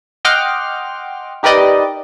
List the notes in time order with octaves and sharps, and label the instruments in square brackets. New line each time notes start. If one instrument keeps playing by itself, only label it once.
[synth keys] D#5 F#5 G5 C6 D6 F6
D#4 G4 A#4 B4 D5 D#5